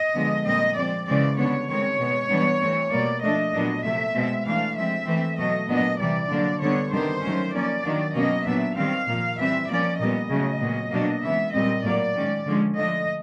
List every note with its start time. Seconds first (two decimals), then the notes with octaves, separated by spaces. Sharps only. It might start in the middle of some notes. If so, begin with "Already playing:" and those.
Already playing: D#5
0.15 D3 F3 G#3 B3
0.46 A#2 G3 C4 D#5
0.76 F3 G#3 C4 D5
1.07 C#3 E3 G#3 C4 D5
1.38 D3 G3 B3 D4 C#5
1.68 D#3 G#3 C4 C#5
1.99 B2 G#3 B3
2.30 E3 G3 B3 D4
2.61 E3 A3 C4
2.91 B2 G3 A#3 D5
3.22 F3 A3 D4 D#5
3.53 A#2 F#3 B3 D4
3.84 C3 F3 A3 E5
4.14 B2 G#3 C4
4.45 E3 A3 D4 F5
4.76 F3 G#3 C4 E5
5.07 E3 A3 C4
5.38 B2 F#3 A3 D#5
5.68 A#2 F#3 B3 D4 D#5
5.99 C3 E3 G3 D5
6.30 D3 F#3 A#3 D4
6.61 D3 G3 B3 D4 C#5
6.92 C3 D#3 G3 B3 D4 C5
7.22 D#3 F#3 A3 C#4
7.53 F3 A#3 C#4 D5
7.84 D#3 F#3 A#3 D4
8.14 B2 F#3 A#3 C#4 D#5
8.45 A#2 F#3 B3 D4 E5
8.76 D#3 G3 C4 F5
9.07 A#2 F3 A#3
9.38 E3 G3 C4 E5
9.69 F3 A#3 C#4 D5
9.99 A#2 G3 B3 D#5
10.30 C#3 F#3 A3
10.61 A#2 F#3 B3
10.92 B2 F#3 A#3 D4
11.22 C#3 E3 G#3 B3 E5
11.53 A#2 G3 C4 D#5
11.84 A2 F#3 A#3 D5
12.15 D#3 G#3 C#4
12.46 D3 F3 G#3 C#4
12.76 D3 F3 A3 D4 D#5